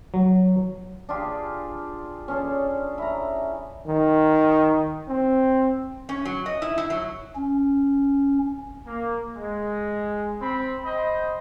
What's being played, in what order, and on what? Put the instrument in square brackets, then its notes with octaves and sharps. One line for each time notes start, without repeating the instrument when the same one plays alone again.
[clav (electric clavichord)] F#3
[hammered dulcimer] D4 F4 G4 G#4
C#4 D4 G#4 A4
E4 A#5
[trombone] D#3
C4
[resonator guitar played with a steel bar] C#4
F#3
D#5
E4
E4
F#3
[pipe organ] C#4
[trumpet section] A#3
G#3
C4 B5
C5 D#5 G5 B5